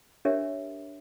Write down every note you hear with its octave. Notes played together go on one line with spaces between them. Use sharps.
D4 G4 A#4 C#5 E5